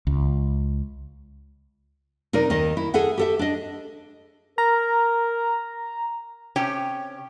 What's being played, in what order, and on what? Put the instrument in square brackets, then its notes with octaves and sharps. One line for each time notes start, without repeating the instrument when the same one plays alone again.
[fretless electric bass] C#2
[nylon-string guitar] C3 D#4 A#4 D5
D#2 D#3 D#5
E4
G#4 A4 E5 F#5
G4 A4 E5
D4 D#5
[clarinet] A#4 [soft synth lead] A#5
[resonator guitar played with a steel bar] C3 C#4 G4 C#5 G5 A5